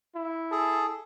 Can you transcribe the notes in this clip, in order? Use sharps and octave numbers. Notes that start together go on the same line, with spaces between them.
E4
G#4 A4